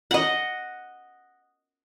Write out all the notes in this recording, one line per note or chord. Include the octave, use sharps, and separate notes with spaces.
D#5 F#5